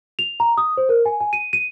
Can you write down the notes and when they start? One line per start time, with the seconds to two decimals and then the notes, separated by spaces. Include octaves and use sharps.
0.19 F7
0.40 A#5
0.57 D#6
0.77 C5
0.89 A#4
1.06 G#5
1.21 G#5
1.33 D#7
1.53 D#7